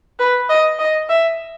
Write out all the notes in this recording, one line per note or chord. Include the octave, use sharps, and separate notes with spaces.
B4
D#5
D#5
E5